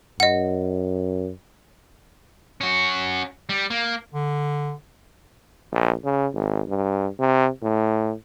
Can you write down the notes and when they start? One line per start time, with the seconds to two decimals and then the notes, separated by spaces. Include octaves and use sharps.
0.20 F#2 D#5 F#5
2.61 C#4 F#4
3.49 G3
3.70 A#3
4.14 D3
5.72 A#1
6.04 C#3
6.34 G#1
6.68 G2
7.19 C3
7.62 A2